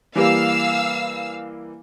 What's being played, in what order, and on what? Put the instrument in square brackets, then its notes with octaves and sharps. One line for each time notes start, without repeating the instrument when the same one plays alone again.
[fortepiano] E3 G3 A#3 [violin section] F5 E6